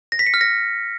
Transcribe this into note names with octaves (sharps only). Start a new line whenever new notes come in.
A#6
B6
C#7
F6
A#6